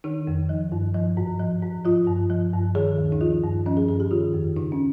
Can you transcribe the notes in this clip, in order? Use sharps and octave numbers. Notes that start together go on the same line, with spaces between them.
D#3 D#4
F2
F3
G2
F3
G#2
F3
G#2
F3 F4
G2
F3
G2
D#3 G#4
D#2
D#4
F3 F4
G2
F3 C#4
G#4
G2 G#4
G4
D#3 F4
F2
C#3 D#4
C#4